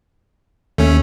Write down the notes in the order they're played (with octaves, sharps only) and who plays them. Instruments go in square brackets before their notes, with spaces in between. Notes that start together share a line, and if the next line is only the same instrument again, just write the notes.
[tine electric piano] D#2 [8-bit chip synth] A3 C#4